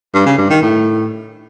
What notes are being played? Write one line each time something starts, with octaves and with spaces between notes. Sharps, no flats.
G2
C#3
G2
D#3
A2